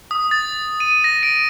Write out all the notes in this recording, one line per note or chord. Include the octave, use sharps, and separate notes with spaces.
D#6
A6
D#7
A#6
D7